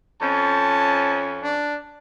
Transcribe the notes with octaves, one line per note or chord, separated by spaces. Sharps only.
F2 C#4 A5
D4